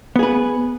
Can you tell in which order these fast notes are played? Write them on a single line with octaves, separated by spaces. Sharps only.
B3 G#4 B4